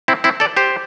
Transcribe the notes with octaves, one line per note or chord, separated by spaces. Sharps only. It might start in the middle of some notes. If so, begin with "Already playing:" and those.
C4 E4
C4 E4
A4 D5
G4 C5